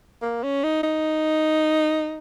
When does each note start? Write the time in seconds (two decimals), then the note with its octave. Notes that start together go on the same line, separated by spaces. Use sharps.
0.22 A#3
0.43 C#4
0.64 D#4
0.83 D#4